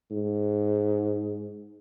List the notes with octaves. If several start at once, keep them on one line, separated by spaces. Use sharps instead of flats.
G#2